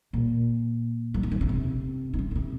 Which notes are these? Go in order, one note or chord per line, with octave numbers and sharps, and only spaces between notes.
A#2
F#3
F3
D#3
C#3
C3
D#3
C#3
A#2
C3